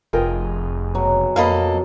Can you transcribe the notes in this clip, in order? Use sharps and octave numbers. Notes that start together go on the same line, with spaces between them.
F1 F4 G#4 A#4 D#5 G5
B2 F#3
F2 A#3 A4 D#5 F5 B5